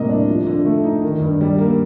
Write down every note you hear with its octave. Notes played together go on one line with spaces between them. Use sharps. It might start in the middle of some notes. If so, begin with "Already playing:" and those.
Already playing: A2 C3 G3 A#3 D#5
D4
F3
D3
A3
D#4
D#3
G2
G3
A#3